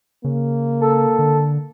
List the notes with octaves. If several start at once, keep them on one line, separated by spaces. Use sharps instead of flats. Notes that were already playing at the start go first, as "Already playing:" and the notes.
C#3 A#3
A4
D3